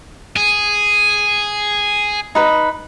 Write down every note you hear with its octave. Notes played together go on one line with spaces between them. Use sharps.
G#4
D#4 B4